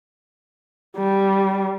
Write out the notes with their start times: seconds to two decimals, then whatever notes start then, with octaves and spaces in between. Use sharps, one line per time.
0.96 G3